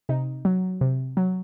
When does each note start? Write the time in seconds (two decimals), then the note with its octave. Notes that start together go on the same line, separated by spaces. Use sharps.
0.09 C3 D#4
0.45 F#3
0.81 C3
1.17 F#3